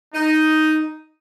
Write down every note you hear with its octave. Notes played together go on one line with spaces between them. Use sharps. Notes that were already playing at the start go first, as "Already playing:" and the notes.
D#4